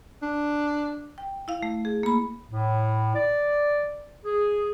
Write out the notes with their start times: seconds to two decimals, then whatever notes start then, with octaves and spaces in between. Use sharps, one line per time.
0.22 D4
1.18 G5
1.48 E4 F5
1.63 A3
1.85 G#4
2.03 A#3 B5
2.51 A2
3.14 D5
4.24 G#4